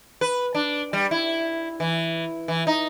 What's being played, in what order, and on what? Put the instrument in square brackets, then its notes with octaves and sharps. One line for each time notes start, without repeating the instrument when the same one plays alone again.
[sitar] B4
D4
G3
E4
E3
E3
D#4